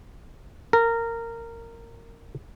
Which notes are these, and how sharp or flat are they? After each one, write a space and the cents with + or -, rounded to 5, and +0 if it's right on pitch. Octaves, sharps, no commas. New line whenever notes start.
A#4 -15